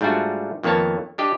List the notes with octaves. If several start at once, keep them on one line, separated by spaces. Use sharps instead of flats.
G#2 G3 A3 D4 F4 F#4
F2 D#3 A#3 B3 C#5 A5
D4 G4 D#5